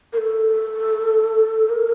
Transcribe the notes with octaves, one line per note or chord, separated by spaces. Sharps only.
A#4
A4
A#4